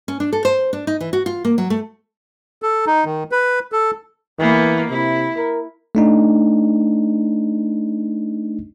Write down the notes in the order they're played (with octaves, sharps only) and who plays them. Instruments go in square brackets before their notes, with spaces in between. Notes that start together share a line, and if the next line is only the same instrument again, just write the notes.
[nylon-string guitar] C#4
D4
A4
C5
D4
D#4
E3
F#4
F4
A#3
F#3
A3
[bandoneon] A4
D#4
D#3
B4
A4
[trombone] E3 [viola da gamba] A#3 B3
[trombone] C3 [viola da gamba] E4
[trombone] A#4
[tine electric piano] A3 D4 D#4